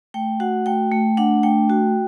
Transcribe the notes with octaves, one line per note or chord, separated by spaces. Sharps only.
A3 G5
F#4 F#5
A3 G5
A3
D4 F#5
A3 G5
F#4